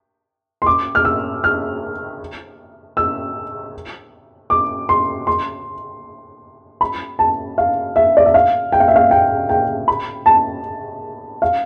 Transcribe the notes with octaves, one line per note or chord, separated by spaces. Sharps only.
C6
D6
F6
E6
F6
E6
D6
C6
C6
B5
A5
F5
E5
D5
E5
F5
G5
F5
E5
F5
G5
G5
B5
A5
F5